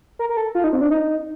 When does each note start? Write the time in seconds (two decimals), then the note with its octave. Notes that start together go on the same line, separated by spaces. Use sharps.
0.19 A#4
0.29 A#4
0.37 A4
0.55 F4
0.64 D#4
0.73 C4
0.81 D4
0.91 D#4